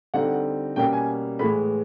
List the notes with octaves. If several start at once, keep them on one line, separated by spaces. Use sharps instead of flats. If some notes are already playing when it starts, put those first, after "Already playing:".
D3 G3 C4 D#4 F#5
B2 G3 A#3 C#4 G5
G#5
A2 E3 G#3 B3 B5